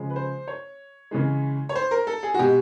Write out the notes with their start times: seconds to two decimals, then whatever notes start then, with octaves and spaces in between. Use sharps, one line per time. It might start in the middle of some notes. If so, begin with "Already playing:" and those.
Already playing: C#3 F3 G#3
0.10 B4
0.16 C5
0.48 C#5
1.11 C#3 E3 G#3
1.69 C#5
1.75 C5
1.91 A#4
2.07 A4
2.23 G#4
2.34 F#4
2.39 B2 G#3 G4